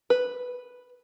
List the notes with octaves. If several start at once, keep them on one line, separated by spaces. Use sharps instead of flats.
B4